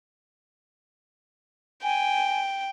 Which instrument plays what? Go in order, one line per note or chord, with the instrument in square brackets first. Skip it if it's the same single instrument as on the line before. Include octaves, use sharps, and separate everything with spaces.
[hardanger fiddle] G5 [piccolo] G#5